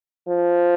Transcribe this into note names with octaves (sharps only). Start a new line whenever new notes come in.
F3